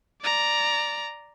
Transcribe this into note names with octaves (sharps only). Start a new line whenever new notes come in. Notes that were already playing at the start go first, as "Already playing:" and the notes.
D5 A#5